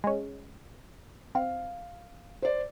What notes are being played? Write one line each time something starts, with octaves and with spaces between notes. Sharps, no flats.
G#3 C#4
C4 F5
C5 D5